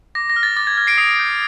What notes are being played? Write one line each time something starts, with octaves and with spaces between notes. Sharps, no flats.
D6 A#6
A#6
F6
A6
D6 A6
G#6
F6 G#6
C7 D7
D#6 C7
G6